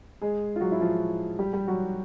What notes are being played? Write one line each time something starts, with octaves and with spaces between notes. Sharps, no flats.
G#3 G#4
F4
F#3 F#4
E4
F3 F4
G3 G4
G3 G4
F#3 F#4